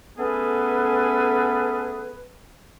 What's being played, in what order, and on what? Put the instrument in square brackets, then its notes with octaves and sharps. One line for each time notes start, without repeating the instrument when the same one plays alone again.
[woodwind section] A3 B3 C#4 G#4 A4 B4